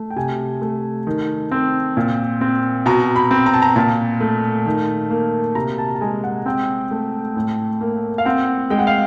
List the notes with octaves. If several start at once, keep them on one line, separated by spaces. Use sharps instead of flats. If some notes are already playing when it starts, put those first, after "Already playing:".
Already playing: A3
G5
C3 G#5
A3
D#3
C4
A#2
C4
B2 A#5
B5
C4
A#5
A5
A#5
A#2 A5
A3
D#3
A#3
C3 A#5
A5
A5
G#3 G#5
F#5
C4 G5
A3
A2
A#3
F5
C4 F#5
G#3 G5
F#5
F5